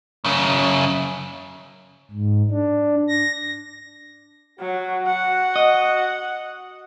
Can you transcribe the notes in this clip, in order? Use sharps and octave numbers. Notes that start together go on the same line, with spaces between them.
F#2 C#3
G#2
D4
A#6
F#3 F#4
F#5
D#5